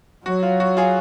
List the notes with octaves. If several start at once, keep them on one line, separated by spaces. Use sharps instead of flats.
F#3 F#4
F4
F#4
F4 G#4